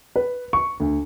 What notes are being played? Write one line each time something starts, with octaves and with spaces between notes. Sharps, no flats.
B4
C#6
D2